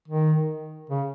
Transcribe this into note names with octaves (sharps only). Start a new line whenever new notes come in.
D#3
C#3